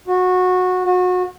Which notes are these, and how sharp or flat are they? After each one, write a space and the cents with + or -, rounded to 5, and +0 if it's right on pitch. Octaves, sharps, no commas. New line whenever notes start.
F#4 -20
F#4 -30